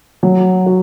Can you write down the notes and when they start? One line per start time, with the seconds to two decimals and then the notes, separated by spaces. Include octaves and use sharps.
0.23 F#3
0.66 F#4